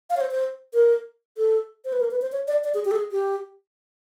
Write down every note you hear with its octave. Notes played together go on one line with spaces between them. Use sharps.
F5
C#5
C5
C5
A#4
A4
C5
B4
A#4
B4
C5
C#5
D5
D5
G#4
G4
A4
G#4
G4